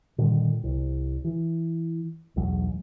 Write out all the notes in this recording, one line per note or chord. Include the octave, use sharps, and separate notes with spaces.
A#2 D3 D#3 G3
C2
E3
B1 E2 G#2 F#3